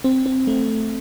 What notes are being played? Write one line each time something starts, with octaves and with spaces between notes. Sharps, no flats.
C4
C4
A3
C4